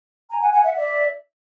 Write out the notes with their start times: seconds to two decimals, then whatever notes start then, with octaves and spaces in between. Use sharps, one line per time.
0.30 G#5 A#5
0.41 F#5 G#5
0.53 F#5 G#5
0.64 E5 F#5
0.76 D5 E5